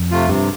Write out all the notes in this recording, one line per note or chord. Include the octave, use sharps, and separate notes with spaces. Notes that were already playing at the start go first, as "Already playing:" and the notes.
Already playing: F2
C3 A3 F4
G2 C3